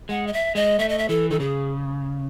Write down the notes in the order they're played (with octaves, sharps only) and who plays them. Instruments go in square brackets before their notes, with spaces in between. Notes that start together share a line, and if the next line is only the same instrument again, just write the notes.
[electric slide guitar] G#3 [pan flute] F#5
[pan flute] D#5
E5
[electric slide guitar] G#3 [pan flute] D#5
[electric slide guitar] A3 [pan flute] E5
[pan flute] D#5
E5
[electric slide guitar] E3 [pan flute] A4
[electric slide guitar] D#3 [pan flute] A4
[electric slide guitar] C#3 [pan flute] G#4